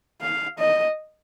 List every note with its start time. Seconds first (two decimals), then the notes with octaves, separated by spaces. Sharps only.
0.21 F5
0.58 D#5